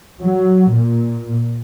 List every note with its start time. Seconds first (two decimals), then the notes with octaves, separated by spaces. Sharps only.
0.23 F#3
0.72 A#2